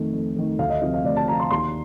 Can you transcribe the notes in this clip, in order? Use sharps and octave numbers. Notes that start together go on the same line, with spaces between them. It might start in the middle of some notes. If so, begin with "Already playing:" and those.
Already playing: F2 D#3 A3
F2
D#3 A3
D2 F5
D#5
C3 F3 D#5
F5
D2 D5
A5
C3 F3 A#5
C6
D#2 C6